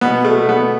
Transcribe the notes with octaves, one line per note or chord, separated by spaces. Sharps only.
B2 B3
A3
B2
B3